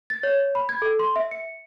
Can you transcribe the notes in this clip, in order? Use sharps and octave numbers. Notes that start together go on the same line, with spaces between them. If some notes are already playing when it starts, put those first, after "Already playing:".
A6
C#5
B5
G#6
A4
C6
E5
C#7